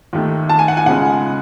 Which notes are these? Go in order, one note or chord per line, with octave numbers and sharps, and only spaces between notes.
D#2 D#3 A3
A5
G#5
F#5
G#5
C#2 C#3 G#3 F#5